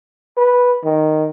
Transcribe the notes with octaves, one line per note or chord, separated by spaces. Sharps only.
B4
D#3